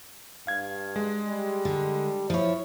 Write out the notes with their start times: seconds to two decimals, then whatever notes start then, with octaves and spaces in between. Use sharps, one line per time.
0.47 G2 F5 G#6
0.96 G#3
1.29 G3
1.65 D3
2.30 F3 E4 C5 C#5